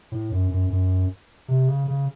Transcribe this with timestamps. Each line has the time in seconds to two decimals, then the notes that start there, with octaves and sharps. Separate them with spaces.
0.12 A2
0.31 F#2
0.51 F#2
0.70 F#2
1.48 C3
1.68 C#3
1.88 C#3